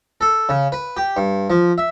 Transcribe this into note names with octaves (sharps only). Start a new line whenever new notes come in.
A4
C#3
B4
G4
G2
F3
E5